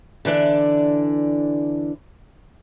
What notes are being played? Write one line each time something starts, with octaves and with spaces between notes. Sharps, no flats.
D3 E3 D4 D5